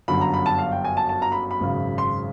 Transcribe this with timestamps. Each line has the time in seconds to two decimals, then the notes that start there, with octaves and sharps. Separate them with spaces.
0.08 G1 F#2 D3 B5
0.21 A#5
0.34 B5
0.46 A5
0.59 F5
0.72 G5
0.84 G#5
0.97 A5
1.09 A5
1.22 A#5
1.32 B5
1.51 B5
1.60 G#1 F#2 C#3
1.98 C6